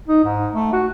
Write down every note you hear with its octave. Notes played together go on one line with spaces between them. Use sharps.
D#4
G#2
A3
F#4